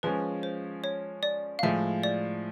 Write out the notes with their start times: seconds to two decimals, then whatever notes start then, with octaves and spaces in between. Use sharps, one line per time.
0.03 F3 G#3 C#4 B4
0.43 C5
0.84 C#5
1.23 D5
1.59 F5
1.63 A2 F3 G#3 E5
2.03 D5